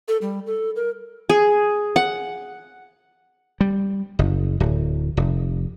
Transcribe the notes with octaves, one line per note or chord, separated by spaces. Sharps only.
A4
G3
A4
A#4
G#4
F#5
G3
F#1
D1
F1